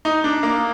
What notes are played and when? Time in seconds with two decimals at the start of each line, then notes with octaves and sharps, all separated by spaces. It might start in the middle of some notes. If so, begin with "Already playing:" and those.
0.05 D#4
0.24 D4
0.43 A#3